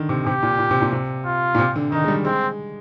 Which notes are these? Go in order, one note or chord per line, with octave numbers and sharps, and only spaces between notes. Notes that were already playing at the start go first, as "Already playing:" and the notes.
Already playing: D3 D#3
C3
C3 G4
A#2
A#2
C3
A#2
C3
F4
A#2
C3
D3
D#3 D#4
G#3
G3
G#3 C4